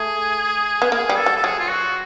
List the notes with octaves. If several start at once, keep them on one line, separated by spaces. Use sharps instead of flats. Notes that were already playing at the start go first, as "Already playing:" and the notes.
Already playing: A3 G#4
B3
A#3 G#4
G3
A4
F#3
A4
F#3 G#4
F4
F#4